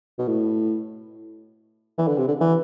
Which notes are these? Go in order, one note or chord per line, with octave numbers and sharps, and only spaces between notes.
B2
A2
E3
D3
C3
D3
E3